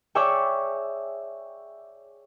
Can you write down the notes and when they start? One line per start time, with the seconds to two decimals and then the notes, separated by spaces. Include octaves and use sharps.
0.15 G#4 C#5 D5 E5 G5